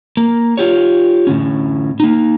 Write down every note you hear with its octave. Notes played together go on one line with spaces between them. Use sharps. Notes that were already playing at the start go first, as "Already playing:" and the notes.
A#3
F4 G4 C#5
A2 D3 C#4
A#3 D#4